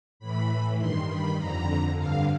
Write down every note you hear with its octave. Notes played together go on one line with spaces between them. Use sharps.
A2 E3 B5
G2 D#3 C6
B5
F2 D3 A#5
G2 D3 F5